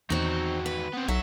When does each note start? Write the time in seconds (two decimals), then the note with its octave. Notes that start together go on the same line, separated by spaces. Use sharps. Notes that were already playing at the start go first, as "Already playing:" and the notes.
0.10 E2 D#3 C4 D#4 F#4
0.66 B4
0.93 B3 C4
1.08 B1 C#5 E5 F#5